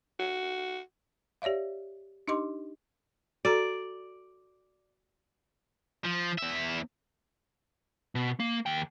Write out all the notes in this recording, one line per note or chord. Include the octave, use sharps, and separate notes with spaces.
F#4
G4 C#5 D5 E5 F5
D4 D#4 G4 D#5 C6 D6
F#4 A4 D5 A#5
F3
E2 E5
B2
A#3
D#2 G5